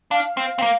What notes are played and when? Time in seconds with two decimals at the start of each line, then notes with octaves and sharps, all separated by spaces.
0.11 D4 F5
0.37 C4
0.58 C4
0.62 A#3